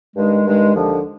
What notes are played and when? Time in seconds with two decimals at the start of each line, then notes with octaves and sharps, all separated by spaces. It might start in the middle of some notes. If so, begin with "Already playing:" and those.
0.16 G2 D#3 G#3
0.45 G2 D#3 G#3
0.74 D#2 D3 F3